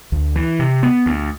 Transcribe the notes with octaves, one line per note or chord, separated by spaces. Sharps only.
D2
E3
C3
B3
D2